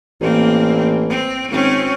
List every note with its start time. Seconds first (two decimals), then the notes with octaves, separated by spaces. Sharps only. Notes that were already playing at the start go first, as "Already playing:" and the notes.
0.21 A1 A#3 C4
1.10 C4
1.51 G#1 C4 C#4